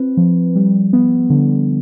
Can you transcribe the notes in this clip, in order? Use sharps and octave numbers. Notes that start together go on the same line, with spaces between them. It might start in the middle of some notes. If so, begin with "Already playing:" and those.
Already playing: C4 F4 B4
F3
G3
B3
D3